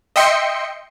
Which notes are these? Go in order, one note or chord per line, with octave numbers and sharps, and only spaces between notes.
D#5 E5 G5 C6 C#7